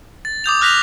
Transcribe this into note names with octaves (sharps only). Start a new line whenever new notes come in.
A6
D6 D#6 G6 F7
F6 F#6 A#6 B6 F7